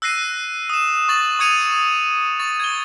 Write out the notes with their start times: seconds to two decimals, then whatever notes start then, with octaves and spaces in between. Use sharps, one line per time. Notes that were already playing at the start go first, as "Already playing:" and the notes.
0.02 E6 F#6 A#6 C7 D#7
0.70 D#6 E7
1.09 C#6 A6 F#7
1.39 C#6 D#6 G#6 C#7 D#7 F7
2.40 C#6 A6
2.60 G#6 G7